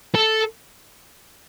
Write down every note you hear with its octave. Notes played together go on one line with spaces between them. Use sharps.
A4